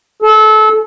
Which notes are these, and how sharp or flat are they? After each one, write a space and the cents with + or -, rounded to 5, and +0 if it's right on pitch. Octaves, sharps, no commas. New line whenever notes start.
A4 -25